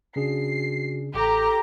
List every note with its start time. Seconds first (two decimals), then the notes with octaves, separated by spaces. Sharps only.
0.16 C#3 D4 F#4 G#4 C7
1.14 A1 G4 A4 A#5